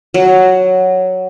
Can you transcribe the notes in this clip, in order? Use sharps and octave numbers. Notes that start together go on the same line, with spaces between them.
F#3